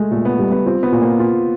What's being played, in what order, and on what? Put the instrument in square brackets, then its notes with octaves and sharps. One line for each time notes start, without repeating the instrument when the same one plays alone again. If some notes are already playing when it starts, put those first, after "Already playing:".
Already playing: [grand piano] G#3 A3
[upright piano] A#2 [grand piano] A3
[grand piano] B3
[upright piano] G3
[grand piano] B3
[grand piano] C4 [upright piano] F4
[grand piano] B3
[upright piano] A#2
[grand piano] A#3
[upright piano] F4